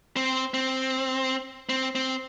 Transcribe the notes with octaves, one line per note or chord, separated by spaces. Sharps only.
C4
C4
C4
C4